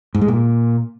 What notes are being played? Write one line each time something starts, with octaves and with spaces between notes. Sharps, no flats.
G#2
G#3
A#2